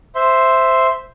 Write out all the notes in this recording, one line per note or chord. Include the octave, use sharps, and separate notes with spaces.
C5 E5 C6